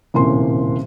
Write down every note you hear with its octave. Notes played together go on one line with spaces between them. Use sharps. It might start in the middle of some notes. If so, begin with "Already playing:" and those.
D#1 A2 C3 A#3 C#4 C6